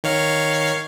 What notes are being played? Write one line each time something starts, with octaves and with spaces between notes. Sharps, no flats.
D#3 C#5 F5